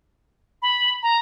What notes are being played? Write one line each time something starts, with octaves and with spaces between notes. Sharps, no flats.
B5
A#5